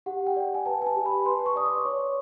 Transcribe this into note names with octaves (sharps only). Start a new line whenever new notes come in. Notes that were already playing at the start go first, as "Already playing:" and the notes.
G4 F#5
G5
D5
G#5
B4 A5
G#5
A5
G4
B5
B4 C6
C#6
D5 D#6
D6
C#5